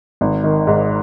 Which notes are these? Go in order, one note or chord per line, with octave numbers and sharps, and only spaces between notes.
G#1
D#3
G#2